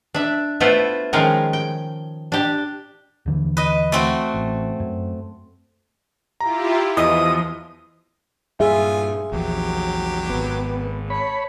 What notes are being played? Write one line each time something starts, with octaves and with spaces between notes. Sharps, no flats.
D4 E5
A3 B3 E4 F4 C5
D#3 F3 G#3 C#4 F4 A#4
G5
D4 G4
D#2 D3 E3
B4 D#5
A3 C4 F#4
A1
F#2
E4 F4 G4 A#5
E2 E3 F3 D#5 D#6
G2 A#2 F4 G#4 E5 G#5
A#1 E2 F#3 G4
G#1 B3
C#5 A5 B5